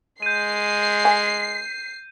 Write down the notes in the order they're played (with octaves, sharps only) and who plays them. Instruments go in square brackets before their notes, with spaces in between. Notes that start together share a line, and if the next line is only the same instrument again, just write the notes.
[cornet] G#3 [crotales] G6 D#7 [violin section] C7
[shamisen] G#5